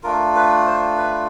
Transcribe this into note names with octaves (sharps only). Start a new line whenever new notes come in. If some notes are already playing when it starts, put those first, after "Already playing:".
A3 D4 F4 A#4
B4
C5
B4